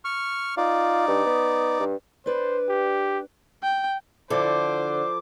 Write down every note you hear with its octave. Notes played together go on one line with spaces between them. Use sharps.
C#6 F6
D#4 F4 D5
G2
B3
G2
D4 B4 C5 D5
G4
G5
D3 F3 E4 C5 D5 D6